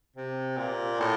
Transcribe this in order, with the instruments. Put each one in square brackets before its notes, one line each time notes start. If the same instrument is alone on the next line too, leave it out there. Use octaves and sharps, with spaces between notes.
[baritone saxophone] C3
A#2
A2